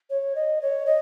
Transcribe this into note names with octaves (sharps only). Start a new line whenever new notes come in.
C#5
D#5
C#5
D#5